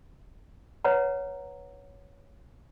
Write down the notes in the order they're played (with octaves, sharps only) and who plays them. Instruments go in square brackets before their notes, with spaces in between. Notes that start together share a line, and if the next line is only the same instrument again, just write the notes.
[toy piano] B4 C#5 F#5 A#5